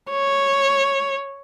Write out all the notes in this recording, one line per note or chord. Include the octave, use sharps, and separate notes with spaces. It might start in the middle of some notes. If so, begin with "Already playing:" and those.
C#5